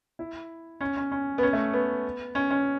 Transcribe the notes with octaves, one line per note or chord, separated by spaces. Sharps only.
E4
C#4
C#4
C#4
B3
C#4
A3
B3
C#4
C#4